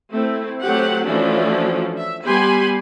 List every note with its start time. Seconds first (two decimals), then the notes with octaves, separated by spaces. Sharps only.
0.12 A3 C4 E4
0.63 F#3 A3 C4 G4 F#5
1.06 E3 F3 A3 C#4 D4 F#4
1.98 E5
2.26 G3 B3 G4 G#5 B5 C6